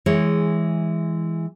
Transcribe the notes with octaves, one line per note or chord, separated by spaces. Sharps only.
E3 G#3 C#5